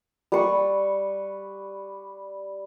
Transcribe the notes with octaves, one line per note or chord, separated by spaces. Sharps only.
G3 B4 C#6